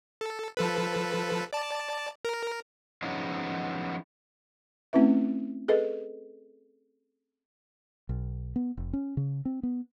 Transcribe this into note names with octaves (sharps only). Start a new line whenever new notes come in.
A4
F3 A4 B4
D5 A5
A#4
F3 F#3 G#3 B3 C#4 D#4
A3 C4 C#4 E4 B4 E5
G#4 A4 B4 D#5
B1
B3
F1
C#4
C#3
C4
B3